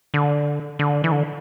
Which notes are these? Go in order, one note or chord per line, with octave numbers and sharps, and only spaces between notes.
D3
D3
E3
D3